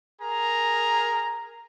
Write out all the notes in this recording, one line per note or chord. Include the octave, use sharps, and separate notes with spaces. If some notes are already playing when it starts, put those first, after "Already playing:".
G#4 A#4 A#5